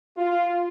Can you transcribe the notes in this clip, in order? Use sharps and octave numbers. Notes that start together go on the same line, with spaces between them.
F4